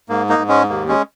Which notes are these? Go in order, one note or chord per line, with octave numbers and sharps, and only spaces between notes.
G#2 A#3
A#3 D#4
G#2
G#3 C#4
D#2 A#3
G#3 C#4